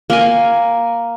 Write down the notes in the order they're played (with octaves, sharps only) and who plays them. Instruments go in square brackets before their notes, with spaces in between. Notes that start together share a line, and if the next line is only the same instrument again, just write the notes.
[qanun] A#3 A#4 G#5